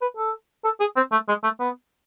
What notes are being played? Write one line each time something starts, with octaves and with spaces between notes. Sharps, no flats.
B4
A4
A4
G#4
C4
A3
G#3
A3
B3